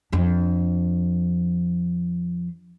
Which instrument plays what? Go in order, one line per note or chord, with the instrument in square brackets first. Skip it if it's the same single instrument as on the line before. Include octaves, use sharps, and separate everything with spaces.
[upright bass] F2 D4